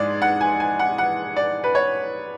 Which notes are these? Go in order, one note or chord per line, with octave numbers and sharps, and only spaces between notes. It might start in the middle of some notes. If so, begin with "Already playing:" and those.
Already playing: G#2 G#3 D5
F#5
G#5
G#5
F#5
F#5
D5
B4
C#5